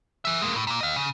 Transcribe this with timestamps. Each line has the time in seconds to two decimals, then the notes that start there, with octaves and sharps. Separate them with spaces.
0.25 G#4 E5
0.41 G#3 A#3
0.56 A2
0.67 A#2 A#3
0.81 D#5 F5
0.96 C#3